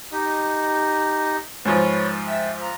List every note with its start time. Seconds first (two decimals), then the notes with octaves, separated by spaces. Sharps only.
0.12 D#4 G4 D#5
1.65 G#2 F3 B4 C#5
2.27 E5 G5 E6
2.60 F4 A#5